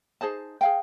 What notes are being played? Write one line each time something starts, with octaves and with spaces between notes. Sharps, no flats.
D#4 G#4 C5 A5
G#4 F5 G5